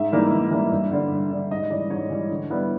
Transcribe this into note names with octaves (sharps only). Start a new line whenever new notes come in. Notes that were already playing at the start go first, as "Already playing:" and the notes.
Already playing: G#2 E5
E3 G3 A#3 D#4
G#2
E3 G3 A#3 D#4
G2
D3 G3
G2
D3 G3
G#2 D#5
E3 G3 D5
G#2 C#5
E3 G3
D3
G3 B3 E4